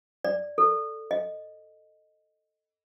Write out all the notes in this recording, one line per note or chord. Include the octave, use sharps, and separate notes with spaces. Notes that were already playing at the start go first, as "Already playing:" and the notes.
D5
A4
D#5